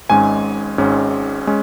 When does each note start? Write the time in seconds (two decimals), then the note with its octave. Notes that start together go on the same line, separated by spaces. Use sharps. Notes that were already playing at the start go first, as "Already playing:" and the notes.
0.09 G#1 G#2 G#3 C#4 G#5
0.78 G#1 G#2 G#3 C#4
1.47 G#3 C#4